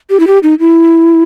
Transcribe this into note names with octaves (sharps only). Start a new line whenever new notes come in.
G4
E4
G4
D#4
E4